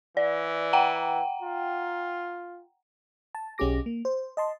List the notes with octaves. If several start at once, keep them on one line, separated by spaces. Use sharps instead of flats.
E3 D5
F#5 G5 A#5
F4
A5
B1 C#4 G4 G#4 D6 A#6
A#3
C5
D#5 A5 C6